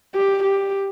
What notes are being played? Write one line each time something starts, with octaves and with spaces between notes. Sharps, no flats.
G4
G4